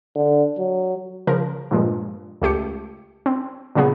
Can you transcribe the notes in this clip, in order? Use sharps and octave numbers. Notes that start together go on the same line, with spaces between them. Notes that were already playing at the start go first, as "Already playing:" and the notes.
D3
F#3
C#3 F3 A#4
G2 A#2 F3 G#3
C#2 A3 G4 C#7
C4
A#2 C#3 F#3 B3 G#4